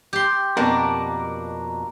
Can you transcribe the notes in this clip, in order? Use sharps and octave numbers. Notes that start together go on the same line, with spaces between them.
G4 C6
F2 B2 A#3 D4 A#4 F#5 A5